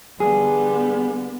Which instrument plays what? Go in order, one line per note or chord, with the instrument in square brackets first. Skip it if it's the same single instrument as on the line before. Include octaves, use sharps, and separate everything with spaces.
[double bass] D3 G3 [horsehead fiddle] B3 [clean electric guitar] G#4